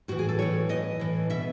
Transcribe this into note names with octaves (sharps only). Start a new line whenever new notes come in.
A2 E3 F#4
G#4
A4
A2 E3 C#5
A2 E3 D#5
A2 E3
B2 E5